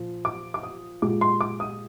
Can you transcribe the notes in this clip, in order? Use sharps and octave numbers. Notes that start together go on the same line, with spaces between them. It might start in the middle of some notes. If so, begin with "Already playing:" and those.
Already playing: A#2 F3
D6
D6
D#6
A#2 G#3 D6
C6
D6
D#6